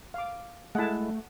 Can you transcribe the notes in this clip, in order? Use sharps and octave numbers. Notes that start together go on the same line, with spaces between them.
F5 D6
G#3 A3 E4 F#5 A5